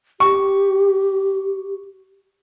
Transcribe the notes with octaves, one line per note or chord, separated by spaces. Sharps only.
G4 C#6